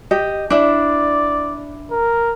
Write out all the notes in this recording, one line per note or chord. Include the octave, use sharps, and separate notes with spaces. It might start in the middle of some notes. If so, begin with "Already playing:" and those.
G4 D#5
D4 E4 D5
A#4